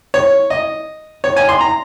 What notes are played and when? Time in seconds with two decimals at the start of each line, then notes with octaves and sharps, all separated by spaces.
0.14 C#5
0.50 D#5
1.24 C#5
1.36 G#5
1.49 C6
1.61 A#5